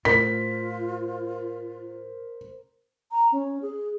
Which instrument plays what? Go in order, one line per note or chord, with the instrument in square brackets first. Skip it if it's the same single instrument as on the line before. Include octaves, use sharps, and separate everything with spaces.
[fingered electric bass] A2 [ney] F4 [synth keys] A#4 C5 [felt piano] B6
[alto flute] A#5
C#4
G#4